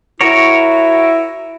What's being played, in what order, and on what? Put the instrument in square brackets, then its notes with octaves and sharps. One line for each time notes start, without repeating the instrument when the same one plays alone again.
[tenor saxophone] E4 [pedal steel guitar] F#4 A#4 C#5